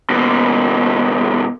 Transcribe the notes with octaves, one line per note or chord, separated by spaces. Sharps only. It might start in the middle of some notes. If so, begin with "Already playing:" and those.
D#2 B2